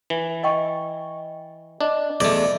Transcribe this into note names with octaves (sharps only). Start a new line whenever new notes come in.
E3
D#5 G5 C#6
D4 D#5
E2 A3 D5